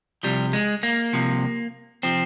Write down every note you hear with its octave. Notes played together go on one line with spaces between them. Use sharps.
C2 C3 F3 G3
G#3
A#3
C2 C3 F3
C3 F3 C4